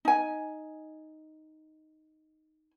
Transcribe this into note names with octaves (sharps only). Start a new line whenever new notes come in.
D#4 G#5